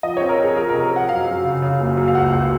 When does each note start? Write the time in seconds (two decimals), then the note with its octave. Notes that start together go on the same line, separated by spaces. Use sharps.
0.03 F3 D#5
0.17 C4 C#5
0.29 A#4
0.39 C4 G#4
0.56 F3 A#4
0.69 C3 A#4
0.83 A#4
0.91 C4
0.96 F#5
1.09 F#2 F5
1.27 F#2
1.45 C#3
1.62 C#3
1.81 F#1
1.97 F#2
2.08 F5
2.15 C#2 F#5
2.33 C#2